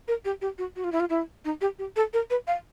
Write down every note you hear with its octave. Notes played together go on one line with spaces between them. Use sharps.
A#4
G4
G4
F#4
F#4
F4
E4
F4
E4
D#4
G4
G4
A4
A#4
B4
F5